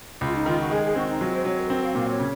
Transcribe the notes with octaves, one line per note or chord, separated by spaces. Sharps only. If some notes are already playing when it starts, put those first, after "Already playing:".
C#2 F4
D#4
D#3 F4
F#4
G#3 G#4
G#4
C4 F#4
D#4
F#3 F4
C5
F#3 C#5
A#4
C4 A#4
F5
A#2 F5
C#5
C#3